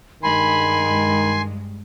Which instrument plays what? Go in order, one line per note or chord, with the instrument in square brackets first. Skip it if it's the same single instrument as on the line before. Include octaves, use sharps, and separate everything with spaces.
[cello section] G2 G#3 [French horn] D#3 [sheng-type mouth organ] G#5 C6 [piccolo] B5